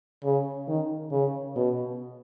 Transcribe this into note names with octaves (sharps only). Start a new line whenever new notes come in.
C#3
D#3
C#3
B2